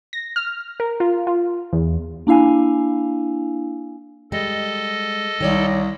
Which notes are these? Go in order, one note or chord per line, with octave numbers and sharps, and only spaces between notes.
A#6
F6
A#4
F4
F4
E2
A#3 D4 E4 F5 G#5
G3 G#3 A4 D#5
C2 D#3 C#5 D5